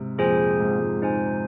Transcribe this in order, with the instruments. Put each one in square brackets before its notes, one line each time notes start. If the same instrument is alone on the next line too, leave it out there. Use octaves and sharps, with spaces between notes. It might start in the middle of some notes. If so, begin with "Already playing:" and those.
Already playing: [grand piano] G#2 C3
[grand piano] F2 A#2 [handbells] G#4 C5 G#5
[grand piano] G#2
F2
G#2
[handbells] D#4 C5 G#5